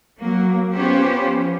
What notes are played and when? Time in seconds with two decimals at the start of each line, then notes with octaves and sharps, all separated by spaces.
0.19 F#3 A#3
0.74 B3 C#4 F4 G4 C5
1.27 F3